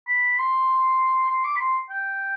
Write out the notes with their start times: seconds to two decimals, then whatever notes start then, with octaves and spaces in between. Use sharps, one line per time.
0.08 B5
0.38 C6
1.29 C6
1.44 D6
1.56 B5
1.60 C6
1.90 G5